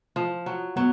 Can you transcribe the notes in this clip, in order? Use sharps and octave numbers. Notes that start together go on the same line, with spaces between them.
F3
F#3
F#3 B3